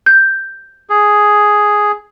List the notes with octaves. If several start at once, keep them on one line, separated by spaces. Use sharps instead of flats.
G6
G#4